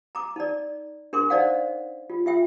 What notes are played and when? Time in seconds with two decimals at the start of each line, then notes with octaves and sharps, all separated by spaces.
0.15 A#5 D6
0.36 D#4 D5
1.13 D4 A#4 C6 D6
1.30 D#4 C5 D5 F5 F#5
2.10 F4
2.26 F4 E5 G5